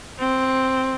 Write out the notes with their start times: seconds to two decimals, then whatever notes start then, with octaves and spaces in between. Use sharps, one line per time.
0.20 C4